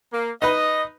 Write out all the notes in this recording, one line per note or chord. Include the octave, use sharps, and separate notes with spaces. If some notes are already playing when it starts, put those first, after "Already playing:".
A#3
D#4 B4 D#5